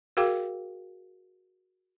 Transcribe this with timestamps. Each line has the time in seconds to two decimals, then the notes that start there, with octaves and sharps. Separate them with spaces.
0.17 F#4 G#4 A#4 F5 G5 D6